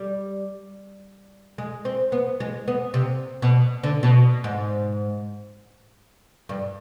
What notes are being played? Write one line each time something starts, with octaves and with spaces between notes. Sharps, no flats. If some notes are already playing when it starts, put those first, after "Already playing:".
Already playing: G3
G#3
C4
B3
G#3
B3
C3
B2
D3
B2
G#2
G2